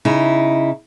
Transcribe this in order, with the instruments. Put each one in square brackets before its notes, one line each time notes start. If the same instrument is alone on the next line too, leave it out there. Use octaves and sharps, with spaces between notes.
[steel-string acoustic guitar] C#3 D#4 E4